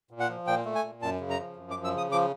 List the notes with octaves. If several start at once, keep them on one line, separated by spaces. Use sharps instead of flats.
A#2
F#5
F3
A#2 G5
A3
G#5
A#2
F#2 A5
C#3
A#5
F3
F#2
D6
F3
E6
C#3 D#6
F3 D6